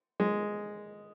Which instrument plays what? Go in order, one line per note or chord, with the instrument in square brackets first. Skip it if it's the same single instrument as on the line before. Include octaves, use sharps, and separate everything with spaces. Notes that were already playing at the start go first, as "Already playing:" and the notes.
[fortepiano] G#3